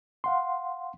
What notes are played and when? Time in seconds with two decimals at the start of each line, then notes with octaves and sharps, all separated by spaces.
0.24 F5 F#5 C6